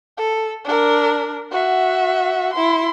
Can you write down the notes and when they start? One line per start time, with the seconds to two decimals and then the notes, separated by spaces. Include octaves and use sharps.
0.17 A4
0.64 D4 A#4
1.51 F#4 E5
2.53 E4 C6